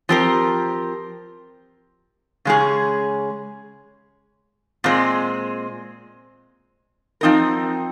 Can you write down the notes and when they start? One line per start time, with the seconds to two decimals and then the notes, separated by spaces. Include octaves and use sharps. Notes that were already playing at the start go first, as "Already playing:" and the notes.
0.09 F3 C4 G4 A#4
2.45 C#3 G#3 C#4 G#4
4.84 A#2 G#3 C4
7.21 F3 C4 D#4 A#4